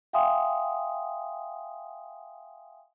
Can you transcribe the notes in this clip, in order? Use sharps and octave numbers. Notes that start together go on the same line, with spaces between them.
E5 F5 G5 G#5 C6 D#6